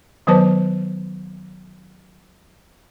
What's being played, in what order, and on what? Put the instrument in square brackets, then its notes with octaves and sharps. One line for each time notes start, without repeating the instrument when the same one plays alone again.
[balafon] D#3 F#3 B3 B4 C5 A5